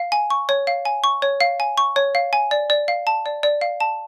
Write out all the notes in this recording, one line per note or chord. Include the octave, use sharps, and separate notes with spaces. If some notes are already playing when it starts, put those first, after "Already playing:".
Already playing: F5
G#5
C#6
C#5
F5
G#5
C#6
C#5
F5
G#5
C#6
C#5
F5
G#5
D5
D5
F5
A5
D5
D5
F5
A5